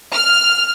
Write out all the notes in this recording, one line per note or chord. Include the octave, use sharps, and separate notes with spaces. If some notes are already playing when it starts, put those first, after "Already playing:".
F6